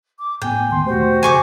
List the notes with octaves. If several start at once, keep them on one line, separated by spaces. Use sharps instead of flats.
D6
A2 B3 G5 G#5
D#2 D#3 B3 C6
E2 B2 A3 F#4 G4 C5
F#1 F2 G#5 C#6 D6